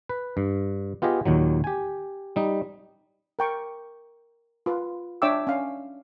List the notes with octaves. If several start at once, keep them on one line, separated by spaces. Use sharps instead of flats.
B4
G2
B3 F4 G4 G#4 D#5
D#2 A#2 D#3 F#3
G4 G#5
G3 D#4
A#4 G5 C#6
F4 B4
D4 C#5 E5 G5 D6 E6
C#4 F5